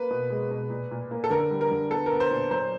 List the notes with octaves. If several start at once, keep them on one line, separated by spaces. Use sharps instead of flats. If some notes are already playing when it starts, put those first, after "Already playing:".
Already playing: A#3 B4
B2
G#3
B2
A#2
A#2
A#3
A4
D3 A#4
G3
A#4
D3
B3 A4
A#4
B3
C5
A#2
F#3 C5